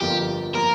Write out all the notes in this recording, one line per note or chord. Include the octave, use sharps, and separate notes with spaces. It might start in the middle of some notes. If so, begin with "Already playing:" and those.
G1 F2 F3 A#3 F4 G4
F3 A#3 F4 A#4